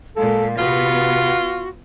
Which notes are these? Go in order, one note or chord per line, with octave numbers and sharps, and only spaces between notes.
A#2 G#3 A4 F5
C3 B3 F4 F#4 B4